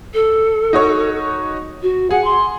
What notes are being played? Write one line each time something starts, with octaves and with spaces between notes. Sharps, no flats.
A4
D#4 F#4 C#5
F#4
G#4 F#5
C6